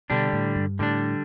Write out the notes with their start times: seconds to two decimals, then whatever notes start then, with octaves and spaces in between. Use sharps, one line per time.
0.10 B2 D3 G3 D4
0.33 A2
0.56 G2
0.79 A2 D3 G3 D4